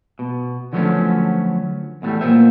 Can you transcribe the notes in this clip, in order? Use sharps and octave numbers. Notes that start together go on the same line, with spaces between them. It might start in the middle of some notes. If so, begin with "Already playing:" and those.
B2
D3 F3 F#3 A3 B3 C#4
E2 A2 F#3 G3 A3
A#2 G#3 A#3 B3 C5 E5